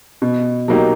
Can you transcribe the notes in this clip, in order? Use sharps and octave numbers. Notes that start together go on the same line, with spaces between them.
B2
F#3 A#3 D#4 G4